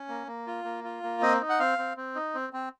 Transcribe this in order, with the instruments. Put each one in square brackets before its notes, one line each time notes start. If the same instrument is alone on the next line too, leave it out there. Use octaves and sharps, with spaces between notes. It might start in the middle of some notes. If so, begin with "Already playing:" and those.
Already playing: [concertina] C#4
A#3
A#3
F4
A#3
F4
A#3
C4 D#5
D#4
F#5
C4 F5
C4
C4
D#4
C4
C4